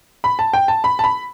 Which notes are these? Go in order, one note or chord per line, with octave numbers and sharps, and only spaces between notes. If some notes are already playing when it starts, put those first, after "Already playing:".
B5
A5
G5
A5
B5
A5
B5